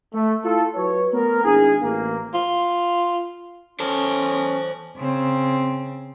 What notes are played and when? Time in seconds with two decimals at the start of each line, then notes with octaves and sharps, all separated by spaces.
0.13 A3
0.43 E4 F4 A4
0.75 F#3 F#4 B4 C#5
1.13 A3 B3 A#4
1.43 G#1 D4 E4 G#4
1.82 A1 A#3
2.34 F4
3.80 C#4 A4 C5 A5
4.97 C#3 C4